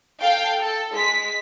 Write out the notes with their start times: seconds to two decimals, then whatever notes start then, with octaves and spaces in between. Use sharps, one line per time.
0.20 A4 F5 G5
0.59 A4
0.96 G#3 B6